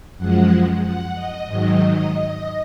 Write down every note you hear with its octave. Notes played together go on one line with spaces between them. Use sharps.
F#2 F3 G#3 F#5
F#5
D#5
G#2 D#3 F#3